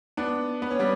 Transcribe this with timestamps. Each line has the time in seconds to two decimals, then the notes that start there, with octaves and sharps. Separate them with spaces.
0.17 B3 D4
0.62 B3
0.71 C#4
0.79 G3 B3